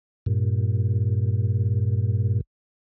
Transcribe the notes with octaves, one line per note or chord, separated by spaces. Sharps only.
G2 A#2